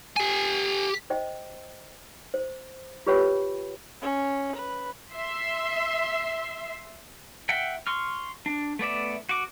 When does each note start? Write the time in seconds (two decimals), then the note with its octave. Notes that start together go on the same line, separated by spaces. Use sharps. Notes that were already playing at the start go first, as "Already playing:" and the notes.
0.17 G4 G#5
1.10 C5 D#5 G5
2.34 C5
3.06 F4 G4 B4 C#5 G5 B5
4.02 C#4
4.56 B4
5.11 E5 C6
7.49 E5 F#5 G5
7.87 C6 C#6 F6
8.46 D4
8.79 A3 B3 D5 E5
9.29 F#4 D6